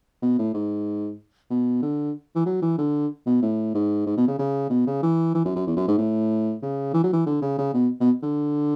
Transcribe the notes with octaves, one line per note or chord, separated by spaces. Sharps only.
B2
A2
G#2
B2
D3
E3
F#3
E3
D3
B2
A2
G#2
G#2
B2
C#3
C#3
B2
C#3
E3
E3
F#2
F#2
E2
F#2
G#2
A2
C#3
E3
F#3
E3
D3
C#3
C#3
B2
B2
D3